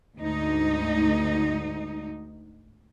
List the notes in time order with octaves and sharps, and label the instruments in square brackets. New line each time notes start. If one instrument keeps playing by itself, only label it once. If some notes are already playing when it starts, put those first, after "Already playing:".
[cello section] D2 G#2 D#4